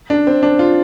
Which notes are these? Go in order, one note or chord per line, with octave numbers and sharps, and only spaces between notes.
D4
C4
D4
F4